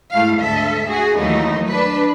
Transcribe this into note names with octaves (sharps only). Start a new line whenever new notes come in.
G#2 A3 E4 F5
D2 G#2 A4 E5
F#4 G#4
D#2 E3 F#3 A3 D#4
D4 B4